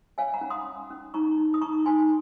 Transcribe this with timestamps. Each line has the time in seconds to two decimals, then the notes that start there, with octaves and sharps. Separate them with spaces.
0.18 C#5 F5 G#5
0.34 F#5 A#5
0.41 C#4
0.50 C6 D#6
0.66 C#4
0.90 C#4
1.14 D#4 A#5 C#6
1.38 D#4
1.54 D#6
1.61 D#4 A#5 C#6
1.86 D#4 G#5 C6